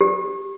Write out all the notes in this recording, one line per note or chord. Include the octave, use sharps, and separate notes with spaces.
G4